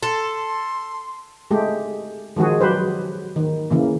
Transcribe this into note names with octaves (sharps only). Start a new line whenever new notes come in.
A4 C6
G#3 A3 G4
D#3 F3 G#3 F#4 G#4
F#3 G4 B4 C5
D#3
C#3 E3 A#3